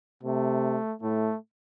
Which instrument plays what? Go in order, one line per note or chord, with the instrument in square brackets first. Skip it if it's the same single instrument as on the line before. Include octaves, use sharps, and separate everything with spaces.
[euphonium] C3 [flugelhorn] A3
[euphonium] A2 [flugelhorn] A3